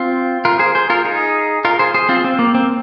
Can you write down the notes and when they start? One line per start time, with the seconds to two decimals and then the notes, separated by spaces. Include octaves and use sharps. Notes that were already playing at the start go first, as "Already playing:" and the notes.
Already playing: C4 F4
0.45 F4 A#4
0.59 G#4 C5
0.75 G#4 C5
0.90 F4 A#4
1.04 D#4 G#4
1.65 F4 A#4
1.79 G#4 C5
1.94 G#4 C5
2.09 C4 F4
2.24 C4
2.39 A#3
2.55 C4